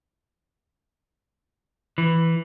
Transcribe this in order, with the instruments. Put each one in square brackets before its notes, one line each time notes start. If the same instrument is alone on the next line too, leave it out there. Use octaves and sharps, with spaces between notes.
[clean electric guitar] E3